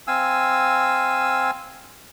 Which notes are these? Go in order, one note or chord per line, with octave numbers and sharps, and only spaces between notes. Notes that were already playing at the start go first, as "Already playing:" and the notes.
C4 F5 G#5 E6